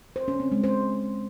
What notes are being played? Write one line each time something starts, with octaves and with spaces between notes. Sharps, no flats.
C5
C#4
C4
G#3
C5